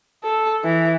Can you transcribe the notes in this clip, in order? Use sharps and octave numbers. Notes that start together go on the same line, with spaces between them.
A4
E3